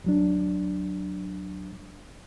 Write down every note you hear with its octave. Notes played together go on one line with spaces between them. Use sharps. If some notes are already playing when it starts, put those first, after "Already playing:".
D2 F#3 D4